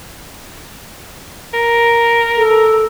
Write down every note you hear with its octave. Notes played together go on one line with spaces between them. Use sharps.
A#4
A4